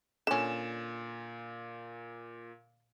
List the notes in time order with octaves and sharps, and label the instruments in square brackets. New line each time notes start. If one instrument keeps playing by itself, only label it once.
[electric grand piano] A#2 E7 [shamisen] D3 C#4